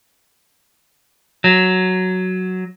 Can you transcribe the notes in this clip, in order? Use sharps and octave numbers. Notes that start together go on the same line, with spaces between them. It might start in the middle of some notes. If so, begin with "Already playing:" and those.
F#3